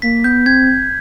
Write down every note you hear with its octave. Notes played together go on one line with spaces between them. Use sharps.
A#3 B6
B3 G6
C4 G#6